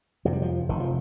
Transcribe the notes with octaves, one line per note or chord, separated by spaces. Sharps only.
F2 C3 F3
G3
F3
F1 D#3
F3